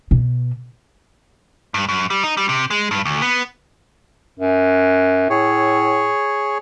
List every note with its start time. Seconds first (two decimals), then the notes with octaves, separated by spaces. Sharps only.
0.11 B2
1.74 G2
1.89 F#2
2.10 G3
2.24 D#4
2.37 G3
2.49 C3
2.70 G#3
2.91 G2
3.05 D2
3.22 B3
4.40 F#2
5.30 A2 G#4 C#5